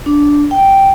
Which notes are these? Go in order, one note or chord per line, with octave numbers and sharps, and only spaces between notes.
D4
G5